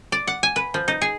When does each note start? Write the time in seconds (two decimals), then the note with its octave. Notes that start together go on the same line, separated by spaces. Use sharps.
0.12 D5
0.27 F#5
0.43 G#5
0.56 B4
0.74 F3
0.88 D#4
1.02 G#4